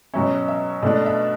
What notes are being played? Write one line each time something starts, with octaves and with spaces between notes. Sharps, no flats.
B2 F#3 C#4 E5
E5
B2 A3 D4
E5